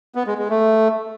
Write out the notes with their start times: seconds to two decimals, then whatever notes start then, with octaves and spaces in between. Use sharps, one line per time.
0.15 B3
0.27 G#3
0.38 G#3
0.50 A3